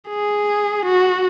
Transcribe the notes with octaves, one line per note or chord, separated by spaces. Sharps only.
G#4
F#4